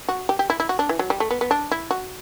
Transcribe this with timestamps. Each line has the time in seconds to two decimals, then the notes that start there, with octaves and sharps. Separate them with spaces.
0.09 F#4
0.29 G4
0.39 G4
0.50 E4
0.60 E4
0.69 F#4
0.79 D4
0.89 E3
0.99 F#3
1.10 G3
1.20 A3
1.31 B3
1.41 B3
1.51 D4
1.71 E4
1.91 F#4